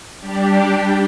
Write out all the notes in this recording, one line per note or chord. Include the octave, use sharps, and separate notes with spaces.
G3 D4 G4